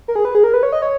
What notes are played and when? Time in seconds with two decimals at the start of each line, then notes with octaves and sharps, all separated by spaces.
0.08 A#4
0.15 G#4
0.25 B4
0.35 G#4
0.44 A#4
0.54 B4
0.63 C#5
0.72 D#5
0.82 C#5